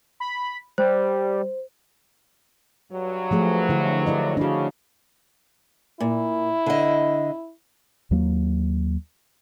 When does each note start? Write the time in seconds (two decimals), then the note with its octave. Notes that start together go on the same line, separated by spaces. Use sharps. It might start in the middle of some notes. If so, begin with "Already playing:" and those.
0.20 B5
0.78 G3 C5
2.91 G2 F#3
3.31 F3 A3 G#4
3.69 D3 E4
4.06 E4 D5 D#5
4.37 C#3 D4 F#4
6.00 A#2 E4
6.66 D3 D#5
8.11 D#2 F#3 A#3